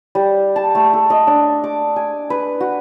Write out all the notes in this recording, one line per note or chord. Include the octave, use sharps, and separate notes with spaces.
G3
A5
A3
A4
D#5
D4
D6
G#5
B4
F#4